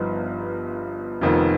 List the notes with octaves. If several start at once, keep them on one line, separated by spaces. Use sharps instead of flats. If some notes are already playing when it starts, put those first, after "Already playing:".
Already playing: G1 G2 F3 B3 D#4
F1 F2 D#3 B3 F4